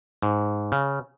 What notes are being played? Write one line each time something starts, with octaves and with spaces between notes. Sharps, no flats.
G#2
C#3